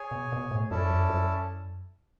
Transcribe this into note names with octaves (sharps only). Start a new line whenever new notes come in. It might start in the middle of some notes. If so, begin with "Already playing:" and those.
Already playing: G#4 C#5 G#5
B2
B2
A2
F#2 C#4 E4 A4 D5 A5
F#2
F#2